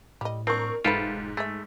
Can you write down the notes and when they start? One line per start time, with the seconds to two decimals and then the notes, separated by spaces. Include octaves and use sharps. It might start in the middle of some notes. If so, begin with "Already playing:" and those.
0.21 A2 G3 D#5
0.47 C4 D4 A#4 C#6
0.84 E1 G#2 F3 A3 F4 G4 A4 B4
1.37 A3 G#4 E5